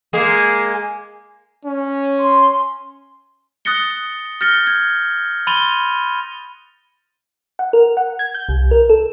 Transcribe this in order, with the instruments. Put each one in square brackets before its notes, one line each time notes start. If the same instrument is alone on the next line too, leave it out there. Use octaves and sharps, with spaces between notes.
[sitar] G#3 A#3 G#4
[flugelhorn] C#4
[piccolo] C6
[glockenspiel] D#6 F#6 A6 A#6 C#7 G7
F6 G6 A6 A#6 C#7 G7
G#6
B5 C6 A6 D#7 F7 G7
[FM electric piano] F#5
A#4
F#5
G#6
G6
C2
A#4
A4